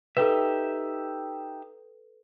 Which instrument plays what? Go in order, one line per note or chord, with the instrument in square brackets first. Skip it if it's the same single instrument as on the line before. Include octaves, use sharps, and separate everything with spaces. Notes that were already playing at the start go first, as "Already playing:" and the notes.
[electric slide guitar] D#4 G4 E5 [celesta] A4 B4